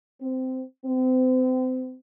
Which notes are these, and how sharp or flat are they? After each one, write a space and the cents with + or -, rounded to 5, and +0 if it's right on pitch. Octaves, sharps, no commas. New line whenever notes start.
C4 -15
C4 -35